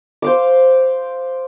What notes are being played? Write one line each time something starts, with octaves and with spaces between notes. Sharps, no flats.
C5 F5 D6